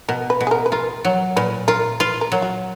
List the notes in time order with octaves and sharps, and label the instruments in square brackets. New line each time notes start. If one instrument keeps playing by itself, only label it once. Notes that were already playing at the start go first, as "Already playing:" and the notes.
[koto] B2 [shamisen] A#4
[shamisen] B4
[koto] B2
[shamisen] G#4
A#4
B4
[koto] F4 [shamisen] A#4
[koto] F#3
[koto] A#2 [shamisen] B4
[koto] F4 [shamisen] A#4
[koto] F4 [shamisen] B4
[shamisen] A#4
[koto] F#3
[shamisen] F#4